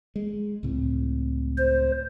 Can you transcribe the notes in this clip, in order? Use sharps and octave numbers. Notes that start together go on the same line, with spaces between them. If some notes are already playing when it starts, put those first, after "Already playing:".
G#3
C#2 A2 C4
C5